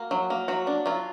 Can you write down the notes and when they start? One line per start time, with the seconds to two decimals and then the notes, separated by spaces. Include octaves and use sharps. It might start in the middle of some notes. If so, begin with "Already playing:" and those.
Already playing: A#3 F#4
0.11 F#3
0.30 A#3
0.48 F#3 F#4
0.67 D4
0.86 F#3 F4